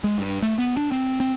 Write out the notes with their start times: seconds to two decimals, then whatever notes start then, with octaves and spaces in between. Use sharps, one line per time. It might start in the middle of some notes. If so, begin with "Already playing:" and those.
0.04 G#3
0.18 G2
0.42 A3
0.58 B3
0.77 D4
0.92 C4
1.20 C4